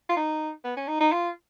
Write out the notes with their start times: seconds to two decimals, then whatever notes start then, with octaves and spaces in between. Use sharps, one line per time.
0.09 F4
0.17 D#4
0.64 B3
0.77 C#4
0.88 D#4
1.00 D#4
1.12 F4